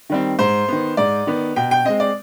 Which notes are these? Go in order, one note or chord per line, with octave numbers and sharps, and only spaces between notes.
D#3 G3 C4
G#2 C5
D#3 B3
G#2 D5
D#3 B3
B2 G5
G5
G#3 C4 D#5
D5